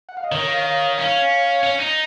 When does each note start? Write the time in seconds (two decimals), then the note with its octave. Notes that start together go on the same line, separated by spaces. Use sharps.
0.09 F#5
0.17 F5
0.24 D#5
0.31 D#3 A#4 C#5
0.48 C#5 F5
0.64 C#5 F5
0.98 C#4 C#5 F5
1.63 C#4
1.80 D#4